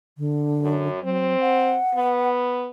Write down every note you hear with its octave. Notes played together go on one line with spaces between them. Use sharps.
D3
F#2
F#3 C4
F#5
B3